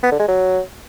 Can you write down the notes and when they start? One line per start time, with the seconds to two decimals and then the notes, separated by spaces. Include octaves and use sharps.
0.03 B3
0.11 D3
0.20 G#3
0.28 F#3